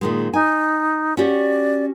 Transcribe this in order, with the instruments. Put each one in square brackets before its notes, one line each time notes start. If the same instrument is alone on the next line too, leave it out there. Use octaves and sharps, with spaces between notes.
[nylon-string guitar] A#2 D#3 G#3
[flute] D#4 [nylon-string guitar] G#5
[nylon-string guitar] C#4 F#4 G4 [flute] D5